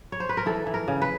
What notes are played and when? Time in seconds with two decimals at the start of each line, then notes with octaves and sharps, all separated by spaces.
0.12 C#5
0.20 C5
0.29 B4
0.37 A#4
0.46 E3 A4
0.67 E3
0.74 A#4
0.88 C#3
1.02 B4